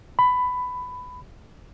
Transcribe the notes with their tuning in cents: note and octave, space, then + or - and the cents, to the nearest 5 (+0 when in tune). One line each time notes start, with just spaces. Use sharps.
B5 +15